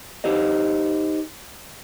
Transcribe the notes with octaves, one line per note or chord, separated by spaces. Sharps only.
D#4 G4 C5 D#5